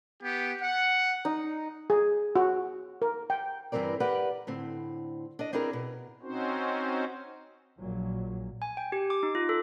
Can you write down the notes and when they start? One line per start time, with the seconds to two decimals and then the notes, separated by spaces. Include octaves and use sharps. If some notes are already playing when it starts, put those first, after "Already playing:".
0.21 B3 G4
0.61 F#5
1.25 D#4
1.90 G#4
2.36 F#4
3.02 A#4
3.30 G5
3.72 G2 E3 G3 C4 A#4 D5
4.00 G4 A#4 B4 D5 F#5
4.47 A2 D3 C4
5.39 D4 D#5
5.53 C4 D4 E4 G#4 A#4
5.73 B2
6.22 C4 C#4 D#4 F#4 C5
7.79 A#1 A#2 F#3
8.62 G#5
8.77 G5
8.92 G4
9.10 D6
9.23 D#4
9.35 F4
9.49 A4